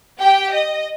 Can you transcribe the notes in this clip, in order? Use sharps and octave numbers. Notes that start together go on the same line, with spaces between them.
G4 G5
D#5